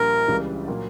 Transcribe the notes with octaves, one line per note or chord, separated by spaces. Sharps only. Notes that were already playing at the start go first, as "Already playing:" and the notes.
Already playing: A#1 A#2 G3 A#4
C#2 C#3 E3 G3
A#2 F#3 A#3